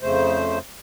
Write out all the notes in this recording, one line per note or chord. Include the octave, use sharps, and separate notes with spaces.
F2 C#3 A3 C5